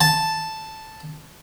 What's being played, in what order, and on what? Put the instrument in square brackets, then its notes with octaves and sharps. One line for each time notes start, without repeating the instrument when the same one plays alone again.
[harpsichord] A5